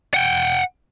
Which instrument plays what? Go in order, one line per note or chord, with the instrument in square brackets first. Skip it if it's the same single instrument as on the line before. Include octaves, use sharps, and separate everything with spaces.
[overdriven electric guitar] F#5 G5